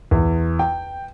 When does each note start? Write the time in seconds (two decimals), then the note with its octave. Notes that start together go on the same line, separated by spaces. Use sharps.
0.11 E2
0.59 G5